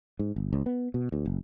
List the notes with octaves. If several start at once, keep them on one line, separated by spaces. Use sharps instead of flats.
G#2
G1
C#2
B3
B2
D2
F#1